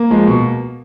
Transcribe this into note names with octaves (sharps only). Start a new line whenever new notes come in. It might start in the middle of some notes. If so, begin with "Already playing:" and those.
Already playing: A#3
F3 G#3
B2